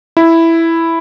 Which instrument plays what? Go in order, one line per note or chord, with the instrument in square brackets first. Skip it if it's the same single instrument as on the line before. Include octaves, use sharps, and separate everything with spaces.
[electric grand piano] E4